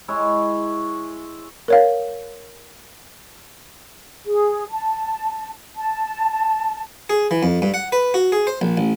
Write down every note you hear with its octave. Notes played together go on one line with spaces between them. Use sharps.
G#3 E4 C#5
A#4 C#5 F5
G#4
A5
A5
G#4
E3
F2
G2
F#5
B4
F#4
G#4
C5
A#1
A1